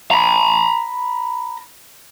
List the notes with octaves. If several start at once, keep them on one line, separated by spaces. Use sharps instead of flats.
A#5 B5